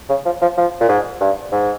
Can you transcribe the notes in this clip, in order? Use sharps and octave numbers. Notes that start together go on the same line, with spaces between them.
C#3
F3
F3
F3
A#2
G#2
G2
G#2